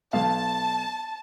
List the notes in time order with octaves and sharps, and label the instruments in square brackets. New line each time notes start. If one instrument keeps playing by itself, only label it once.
[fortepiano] B1 F5 [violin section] A5